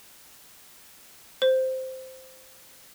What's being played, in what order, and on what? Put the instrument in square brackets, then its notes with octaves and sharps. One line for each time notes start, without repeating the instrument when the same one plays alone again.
[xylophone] C5